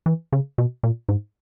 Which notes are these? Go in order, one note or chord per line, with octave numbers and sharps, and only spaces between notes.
E3
C#3
B2
A#2
G#2